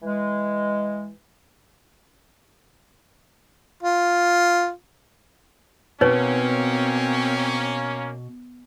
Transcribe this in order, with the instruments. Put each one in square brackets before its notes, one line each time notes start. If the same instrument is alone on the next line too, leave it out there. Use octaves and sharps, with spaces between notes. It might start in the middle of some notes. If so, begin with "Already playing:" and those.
[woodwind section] E3 G#3
[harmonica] F4
[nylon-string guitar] B2 [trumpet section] A#3 C#4 [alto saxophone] C4 [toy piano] D#4 B4 C#5